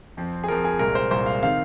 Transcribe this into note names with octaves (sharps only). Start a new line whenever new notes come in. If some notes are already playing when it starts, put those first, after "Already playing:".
F2 F3 C4
G#4
F2 F3 C4 A#4
G#4
C2 A#2 G#3 A#4
C5
C2 A#2 G#3 C5
F5
D#3 C4 F5